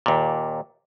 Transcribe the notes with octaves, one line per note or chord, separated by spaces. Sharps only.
D#2 A#2